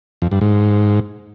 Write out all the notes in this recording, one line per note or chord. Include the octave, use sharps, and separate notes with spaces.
F2
G2
G#2